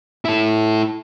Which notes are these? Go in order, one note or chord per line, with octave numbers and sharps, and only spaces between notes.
E4 A4